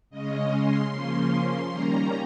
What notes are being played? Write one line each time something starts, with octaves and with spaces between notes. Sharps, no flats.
C#3 G#3 C#4 D#5
C6
C#3 F3 A#3 C#4 C6
C6
D#3 G3 A#3 C#4 A#5